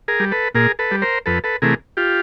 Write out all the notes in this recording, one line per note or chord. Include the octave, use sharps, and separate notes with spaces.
G#4 A#4
G3
A4 B4
A#2 G#4 A#4
A4 B4
G3
A#4 C5
F2 A4 B4
A4 B4
C3 E3 A3 G#4 A#4
F4 G4